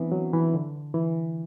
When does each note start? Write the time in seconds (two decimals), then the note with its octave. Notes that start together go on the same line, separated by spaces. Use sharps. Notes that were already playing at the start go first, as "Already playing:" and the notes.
Already playing: E3 B3 C4 D4
0.12 F#3
0.33 E3
0.54 D3
0.94 E3